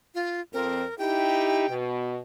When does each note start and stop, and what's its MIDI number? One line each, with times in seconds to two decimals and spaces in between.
0.15 0.40 65
0.53 0.83 41
0.53 0.83 60
0.53 0.97 70
0.98 1.67 63
0.98 1.67 64
0.98 1.67 67
0.98 1.74 79
1.69 2.19 47